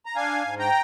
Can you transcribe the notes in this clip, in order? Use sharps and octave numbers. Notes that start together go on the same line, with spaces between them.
A#5
D4 F5 G#5
G#2
G5 A#5